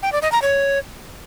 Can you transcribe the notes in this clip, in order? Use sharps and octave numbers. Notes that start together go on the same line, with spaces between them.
G5
D5
D#5
A#5
C#5